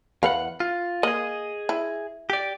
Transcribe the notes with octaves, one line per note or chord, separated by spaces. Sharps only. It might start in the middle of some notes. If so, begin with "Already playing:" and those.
E2 B4 F5 F#5
F4
A#3 G#4 D#5
E4
G4 D5